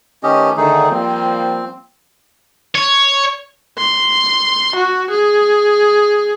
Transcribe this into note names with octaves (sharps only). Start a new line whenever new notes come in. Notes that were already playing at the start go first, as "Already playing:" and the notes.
D#3 A3 C#4 G4 B4 D#5
D3 D#3 A3 D#4 G#4
F3 G3 A#3 C4
C#5
C6
F#4
G#4